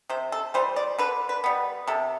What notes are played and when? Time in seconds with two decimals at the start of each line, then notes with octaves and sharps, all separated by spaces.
0.09 C3 C5
0.32 A4
0.54 E3 G3 C5
0.76 D5
0.98 D3 B4
1.29 B4
1.44 G3 B3
1.87 C3 A4